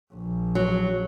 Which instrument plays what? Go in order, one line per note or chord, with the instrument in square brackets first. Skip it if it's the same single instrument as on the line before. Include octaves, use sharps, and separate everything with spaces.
[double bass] A#1
[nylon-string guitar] F#3